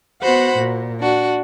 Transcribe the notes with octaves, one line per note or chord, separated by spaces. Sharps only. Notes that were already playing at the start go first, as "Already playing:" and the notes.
B3 F#4 C5 F#5 B5
A#2
D4 F#4